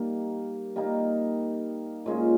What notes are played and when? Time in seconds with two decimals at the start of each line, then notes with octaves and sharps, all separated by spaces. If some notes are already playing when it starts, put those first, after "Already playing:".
Already playing: G3 A#3 D#4
0.76 G3 A#3 D#4
2.06 A#2 G#3 C#4 F4